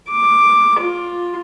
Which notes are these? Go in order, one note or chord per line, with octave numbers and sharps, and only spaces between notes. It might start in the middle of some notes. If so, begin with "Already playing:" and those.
D6
F4